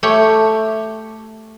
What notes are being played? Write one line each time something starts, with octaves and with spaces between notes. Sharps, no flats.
A3 G4 C#5